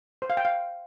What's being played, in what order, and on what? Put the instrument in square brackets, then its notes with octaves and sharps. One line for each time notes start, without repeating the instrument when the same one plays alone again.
[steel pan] C5
F5
G5
F5